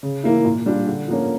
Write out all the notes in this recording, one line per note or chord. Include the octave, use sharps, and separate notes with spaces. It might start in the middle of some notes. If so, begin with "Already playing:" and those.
C#3
E3 A#3 E4
A#2
G3 D4 F4
D3
F3 A#3 C#4